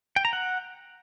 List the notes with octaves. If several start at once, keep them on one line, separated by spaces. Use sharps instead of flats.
G5
A#5
F#5